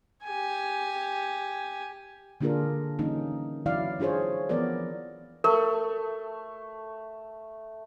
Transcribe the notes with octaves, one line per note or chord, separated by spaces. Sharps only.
G4 G#5
D3 A#3 D4 F4 G#4 A#4
E3 G3 A#3 C#4 D#4
E3 F#3 E4 D5 F5
D4 F4 G#4 C5 C#5
E3 F3 B3 C4 A#4 D5
A3 A#4